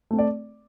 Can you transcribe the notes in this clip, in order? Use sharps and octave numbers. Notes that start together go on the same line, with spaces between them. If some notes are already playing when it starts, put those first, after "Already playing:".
A3 C4
D5